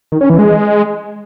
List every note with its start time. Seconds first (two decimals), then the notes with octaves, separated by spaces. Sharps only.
0.12 D#3
0.21 C#4
0.30 E3
0.39 G#3